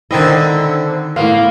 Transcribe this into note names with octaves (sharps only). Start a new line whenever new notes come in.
D3 D#3 C4 E4 D#5
A2 A#3 B3 F5 C6